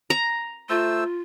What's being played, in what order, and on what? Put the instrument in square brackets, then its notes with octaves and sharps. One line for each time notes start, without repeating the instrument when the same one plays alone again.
[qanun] A#5
[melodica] A3 C5 E6 [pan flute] F4